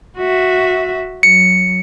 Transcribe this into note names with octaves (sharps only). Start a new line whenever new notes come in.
F#4 E5
F#3 C#7